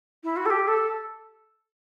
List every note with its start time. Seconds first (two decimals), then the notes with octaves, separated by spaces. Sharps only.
0.24 E4
0.36 F#4
0.46 A4
0.50 G4
0.68 A4